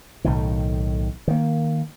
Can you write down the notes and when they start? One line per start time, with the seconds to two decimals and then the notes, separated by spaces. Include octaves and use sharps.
0.24 B1 A2 D#3
1.28 D#3 A#3